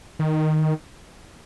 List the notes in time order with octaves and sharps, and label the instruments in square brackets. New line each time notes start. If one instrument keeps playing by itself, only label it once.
[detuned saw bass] D#3